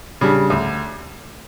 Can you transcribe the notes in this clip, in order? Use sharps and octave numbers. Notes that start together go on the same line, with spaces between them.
C#3 G3 D4
D2